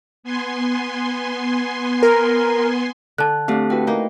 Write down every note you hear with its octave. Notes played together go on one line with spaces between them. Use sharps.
B3 G#5 C6
A#4
D3 A5 F#6
A3 C4 D4 G4 A4 F5
E4 F#4 B4 G5
A#3 D#4